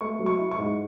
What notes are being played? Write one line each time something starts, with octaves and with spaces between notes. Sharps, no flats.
A3 C#6
F#3
C#6
E4
C#6
G#2